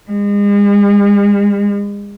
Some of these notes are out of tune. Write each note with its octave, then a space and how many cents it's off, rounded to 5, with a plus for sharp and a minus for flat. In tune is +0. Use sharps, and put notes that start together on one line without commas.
G#3 -40